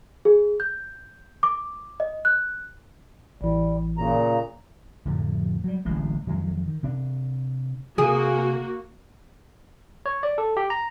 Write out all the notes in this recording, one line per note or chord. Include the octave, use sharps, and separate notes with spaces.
G#4
G6
D6
D#5
F#6
A1 E3 G3
A#2 C#3 A#5
F2 A2 D3 F3
F#3 G3
D1 A1 G#2 G#3
F2 D#3 F#3 G#3
D#3
C3 D4
C3 A#3 F#4 G#4
C#5
D5
A4
G4
A#5